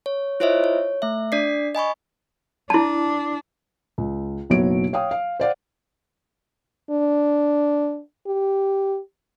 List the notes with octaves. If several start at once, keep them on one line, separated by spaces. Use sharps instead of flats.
C#5
E4 F4 C5 C#5 D#5 E5
C#5
A3 E5
D4 D5 B6 C7
D#5 G#5 B5 C#6
D4 E4 A5
C#2
F#1 B1 B2 F#3 C#5 D7
C#5 F5 G5 D#6
F5
C5 D5 F5 F#5
D4
G4